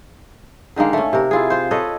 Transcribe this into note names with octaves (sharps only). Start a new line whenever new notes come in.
D3 D#3 G#3 A#3
A3 C#4
C3 A#4
E4 F4 G#4
F4 C5
A4 B4 C#5 D#5